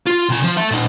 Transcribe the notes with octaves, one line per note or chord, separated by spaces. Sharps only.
F4
C3 G#5
F3
A4 E5
A#2 D#4